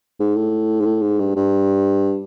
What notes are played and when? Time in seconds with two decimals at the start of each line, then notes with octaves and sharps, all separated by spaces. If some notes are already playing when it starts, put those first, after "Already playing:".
0.20 G#2
0.36 A2
0.81 G#2
0.86 A2
1.02 G#2
1.19 G2
1.36 G2